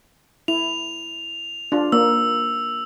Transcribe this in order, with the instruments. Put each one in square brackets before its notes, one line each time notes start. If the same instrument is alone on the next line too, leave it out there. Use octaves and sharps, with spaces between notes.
[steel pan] E4 [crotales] F7
[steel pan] D4 F4
[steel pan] A#3 [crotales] E6